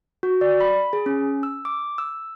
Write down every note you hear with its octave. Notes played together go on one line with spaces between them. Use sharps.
F#4
D5
B5
G#4
C#4
E6
D6
E6